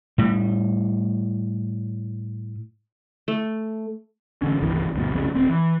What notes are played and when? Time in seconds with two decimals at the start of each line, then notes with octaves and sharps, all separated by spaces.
0.18 A2 G3
3.28 A3
4.42 A1 D3 C#4
4.61 G1 C2 D#3 E3
4.95 D2 G2 B2
5.11 C2 F2 C#3
5.34 D#1 C4
5.49 E3